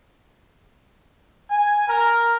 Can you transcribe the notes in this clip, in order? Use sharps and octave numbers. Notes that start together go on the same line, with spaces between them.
G#5
A#4